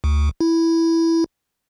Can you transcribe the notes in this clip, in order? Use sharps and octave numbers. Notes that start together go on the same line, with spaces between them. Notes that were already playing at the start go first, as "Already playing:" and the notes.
D2
E4